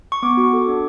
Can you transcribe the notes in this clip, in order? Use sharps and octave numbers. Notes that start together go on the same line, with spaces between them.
C#6
B3 D6
F#4
A4
D4